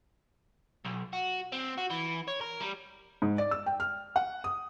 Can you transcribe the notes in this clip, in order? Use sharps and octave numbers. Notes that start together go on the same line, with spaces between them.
B1
F#4
C4
F#4
E3
C#5
A#4
G3
G#2
D5
E6
G5
F6
F#5
D#6